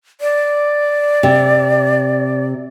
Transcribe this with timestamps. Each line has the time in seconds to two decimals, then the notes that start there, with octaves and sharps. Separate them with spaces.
0.21 D5
1.23 C3